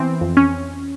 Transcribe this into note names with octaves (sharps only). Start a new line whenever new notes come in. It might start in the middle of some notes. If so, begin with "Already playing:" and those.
Already playing: E3 B3 C4
F2
C#4